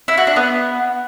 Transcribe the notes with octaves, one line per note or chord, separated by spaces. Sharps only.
E4
F#4
D4
B3